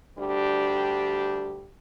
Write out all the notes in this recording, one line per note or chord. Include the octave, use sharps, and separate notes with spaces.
D2 G3 D4 G4